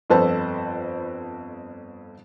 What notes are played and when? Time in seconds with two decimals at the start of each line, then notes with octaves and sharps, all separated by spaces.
0.10 G1 F2 A4 B4 C5 A5